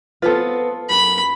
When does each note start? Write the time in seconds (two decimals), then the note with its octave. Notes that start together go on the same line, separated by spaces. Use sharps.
0.22 B3 C4 F4 A4 B4
0.90 F#2 B5